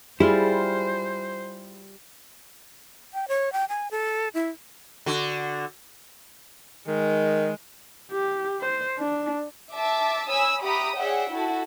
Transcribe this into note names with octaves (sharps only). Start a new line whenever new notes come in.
G3 E4 F4 G#4 C5
G5
C#5
G5
G#5
A4
E4
D3 F#4
D#3 G#3
G4
C5
D4
E5 A5 D6
C#5 G#5 B5 D#6 E6
G4 E5 F#5 A#5 B5 D#6
G#4 C#5 D5 E5 F#5 G5
E4 F#4 A4